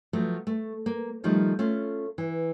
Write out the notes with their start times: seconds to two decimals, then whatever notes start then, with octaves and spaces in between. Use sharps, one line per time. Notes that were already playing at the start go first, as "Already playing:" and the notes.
0.13 F3 F#3 A3
0.47 A3
0.86 A#3
1.24 D#3 F3 G3 A3 D#4
1.59 A3 C#4 F4
2.18 E3